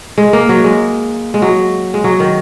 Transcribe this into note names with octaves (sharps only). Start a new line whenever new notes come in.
G#3
A#3
F#3
G#3
G#3
F#3
G#3
F#3
D#3